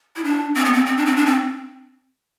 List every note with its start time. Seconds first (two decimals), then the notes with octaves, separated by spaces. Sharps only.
0.16 E4
0.24 D4
0.55 C4
0.65 B3
0.73 C4
0.86 C4
0.97 D4
1.06 C4
1.16 D4
1.26 C4